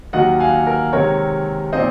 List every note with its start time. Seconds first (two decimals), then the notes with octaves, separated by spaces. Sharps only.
0.13 D#2 D#3 F#3 D#5 F#5
0.40 F5 G#5
0.67 A#4
0.93 C3 D#3 G#3 C4 A#4 C#5
1.73 A#2 F3 C4 D#4 C5 D#5